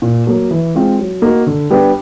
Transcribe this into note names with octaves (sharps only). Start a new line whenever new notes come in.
A#2
F#3 A#3
E3
G#3 C4 F4
F#3
A#3 D#4 F#4
D3
G3 B3 D4 G4